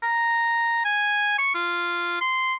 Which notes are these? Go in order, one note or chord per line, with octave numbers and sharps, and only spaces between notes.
A#5
G#5
C#6
F4
C6